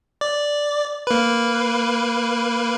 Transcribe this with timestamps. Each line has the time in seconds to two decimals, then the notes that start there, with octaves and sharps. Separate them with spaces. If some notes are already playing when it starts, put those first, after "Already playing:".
0.21 D5
1.07 A#3 B4